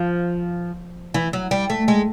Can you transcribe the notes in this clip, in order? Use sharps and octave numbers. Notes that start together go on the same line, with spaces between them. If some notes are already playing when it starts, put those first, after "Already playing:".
Already playing: F3
E3
F#3
G3
A3
G#3